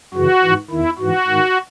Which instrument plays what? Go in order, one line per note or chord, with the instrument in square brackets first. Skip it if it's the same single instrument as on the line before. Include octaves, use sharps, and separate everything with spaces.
[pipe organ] F#2 C#3 E3 F#4
G#2 E3
E2 D#3 E4
G#2 E3 F#4
G#2 D#3